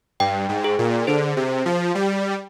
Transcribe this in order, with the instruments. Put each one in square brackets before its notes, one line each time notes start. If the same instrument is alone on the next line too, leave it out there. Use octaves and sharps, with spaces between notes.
[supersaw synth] G2 [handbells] G5
[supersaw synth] G#2
[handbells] G#4
[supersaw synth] A#2
[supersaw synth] D3 [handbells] C5
[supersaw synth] C3
[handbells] G#4
[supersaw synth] F3
[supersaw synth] G3 [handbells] G5